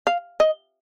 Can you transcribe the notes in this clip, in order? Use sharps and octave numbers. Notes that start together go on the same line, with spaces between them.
F5
D#5